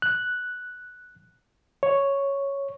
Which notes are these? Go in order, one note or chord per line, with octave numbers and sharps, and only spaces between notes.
F#6
C#5